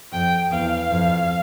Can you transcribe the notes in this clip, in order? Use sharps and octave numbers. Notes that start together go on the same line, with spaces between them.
F2 G5
E2 F5
F2